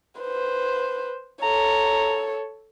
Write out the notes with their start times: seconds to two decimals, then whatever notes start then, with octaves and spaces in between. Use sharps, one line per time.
0.21 B4 C5
1.42 A4 C#5 A#5